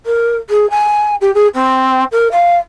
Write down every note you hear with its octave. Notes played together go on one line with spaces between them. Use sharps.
A#4
G#4
G#5
G4
G#4
C4
A#4
F5